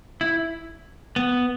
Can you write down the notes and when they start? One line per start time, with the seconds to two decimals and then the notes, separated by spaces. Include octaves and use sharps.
0.21 E4
1.16 B3